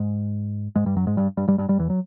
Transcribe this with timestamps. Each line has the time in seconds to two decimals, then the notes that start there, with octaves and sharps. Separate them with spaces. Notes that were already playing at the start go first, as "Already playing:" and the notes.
Already playing: G#2 G#3
0.76 G#2 G#3
0.86 G2 G3
0.96 F#2 F#3
1.07 G#2 G#3
1.17 G2 G3
1.37 G2 G3
1.48 G2 G3
1.58 G2 G3
1.69 G2 G3
1.79 E2 E3
1.90 F#3